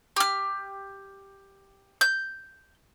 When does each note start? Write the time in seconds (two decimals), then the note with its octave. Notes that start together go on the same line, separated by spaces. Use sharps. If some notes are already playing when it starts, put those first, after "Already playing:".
0.16 G4 F6
2.01 G6